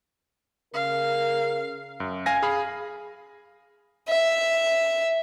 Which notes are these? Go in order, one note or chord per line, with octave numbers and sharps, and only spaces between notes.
C#3 A#4 F5
F#2
F5 G#5 A#6
G#4 F5 B5
E5